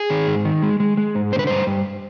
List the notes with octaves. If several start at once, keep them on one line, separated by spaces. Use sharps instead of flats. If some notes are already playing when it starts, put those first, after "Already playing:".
Already playing: G#4
D#3
G#2
D#3
G#3
G#3
G#3
G#2
D3 C5
B4
G2 C5
G2